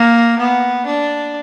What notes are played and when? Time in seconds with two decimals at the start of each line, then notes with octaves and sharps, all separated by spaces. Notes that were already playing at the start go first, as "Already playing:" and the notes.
Already playing: A#3
0.39 B3
0.86 D4